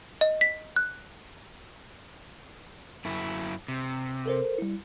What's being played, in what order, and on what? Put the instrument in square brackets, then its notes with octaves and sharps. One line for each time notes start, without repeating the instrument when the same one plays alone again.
[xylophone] D#5
B6
F#6
[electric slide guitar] F#2 E4
C3
[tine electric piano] A4 A#4 C5
G3 E4